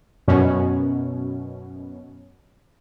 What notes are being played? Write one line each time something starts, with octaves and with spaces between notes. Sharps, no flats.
F#2 B2 C#4